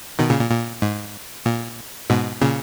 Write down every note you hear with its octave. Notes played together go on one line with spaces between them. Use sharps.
B2 D#3
A#2 C#3
A#2
A#2
G#2
A#2
G#2 B2
A#2 C#3